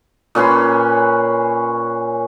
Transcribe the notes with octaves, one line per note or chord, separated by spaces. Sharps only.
A#2 C#4 B4 C6